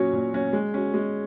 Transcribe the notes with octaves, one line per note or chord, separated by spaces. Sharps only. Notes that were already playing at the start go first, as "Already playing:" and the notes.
Already playing: A#2 F#3 C#4 F#4 C#5
A#2
F#3 C#4 F#4 C#5
G#3
C#4 F#4
G#3